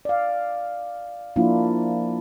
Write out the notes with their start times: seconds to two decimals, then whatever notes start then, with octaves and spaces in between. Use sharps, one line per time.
0.05 D5 F5
1.36 F3 A#3 D4 E4 F4